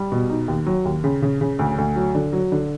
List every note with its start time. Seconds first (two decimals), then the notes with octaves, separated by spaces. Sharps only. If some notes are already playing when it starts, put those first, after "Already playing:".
Already playing: G3
0.12 B2
0.29 D#4
0.48 D#2
0.67 F#3
0.85 D#2
1.04 C#3
1.22 C#3
1.41 C#3
1.59 D2
1.78 D2
1.96 F#3
2.15 D3
2.33 F#3
2.52 D3